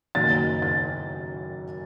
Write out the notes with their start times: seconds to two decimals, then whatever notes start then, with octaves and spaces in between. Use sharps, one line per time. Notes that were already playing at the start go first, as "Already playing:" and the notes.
0.15 F#1 F#2 D#3 A6
0.62 A6